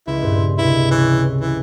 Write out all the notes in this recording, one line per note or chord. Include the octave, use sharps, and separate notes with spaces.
C#2 E4
G2 A#2 C4
C#2 C3 E4
E3 C#5
E3